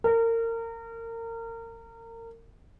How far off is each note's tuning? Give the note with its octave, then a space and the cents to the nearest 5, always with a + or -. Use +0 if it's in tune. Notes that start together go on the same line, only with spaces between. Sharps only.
A#4 -30